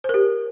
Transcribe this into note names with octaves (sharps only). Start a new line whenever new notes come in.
G4 A#4 C5